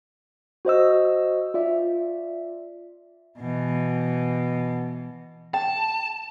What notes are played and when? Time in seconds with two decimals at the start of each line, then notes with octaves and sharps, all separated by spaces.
0.65 F#4 C5 D#5 E6
1.54 F4 D5 E5
3.39 B2 E3
5.54 G5 A5